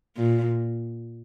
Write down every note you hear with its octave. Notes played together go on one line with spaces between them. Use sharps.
A#2